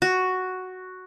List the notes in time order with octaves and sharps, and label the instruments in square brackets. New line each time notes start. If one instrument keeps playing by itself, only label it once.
[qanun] F#4